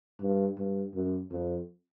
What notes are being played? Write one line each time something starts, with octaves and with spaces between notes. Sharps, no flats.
G2
G2
F#2
F2